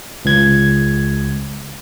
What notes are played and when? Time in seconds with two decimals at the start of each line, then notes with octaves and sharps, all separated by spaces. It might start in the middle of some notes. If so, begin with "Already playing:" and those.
0.25 C#2 G#6